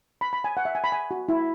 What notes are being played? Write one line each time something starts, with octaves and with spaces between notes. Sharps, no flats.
B5
B5
G#5
F#5
E5
G#5
B5
G#5
F#4
E4